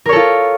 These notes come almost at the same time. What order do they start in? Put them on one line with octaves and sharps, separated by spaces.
A#4 C#5 A4 F4